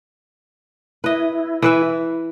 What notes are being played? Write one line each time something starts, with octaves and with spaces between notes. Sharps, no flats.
E4 B4 D#5
E3 B4 E5